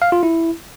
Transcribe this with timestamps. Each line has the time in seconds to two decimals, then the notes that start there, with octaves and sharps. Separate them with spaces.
0.02 F5
0.12 F4
0.23 E4